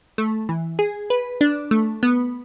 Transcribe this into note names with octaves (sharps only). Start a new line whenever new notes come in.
A3
E3
G#4
B4
D4
A3
B3